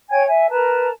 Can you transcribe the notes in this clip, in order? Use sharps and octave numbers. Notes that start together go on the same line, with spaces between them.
C#5 G5 G#5 G#6
E5 G#5
A#4 B4 A5 A#5